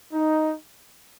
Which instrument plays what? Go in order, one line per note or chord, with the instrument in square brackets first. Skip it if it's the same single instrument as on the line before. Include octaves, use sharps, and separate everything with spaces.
[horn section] D#4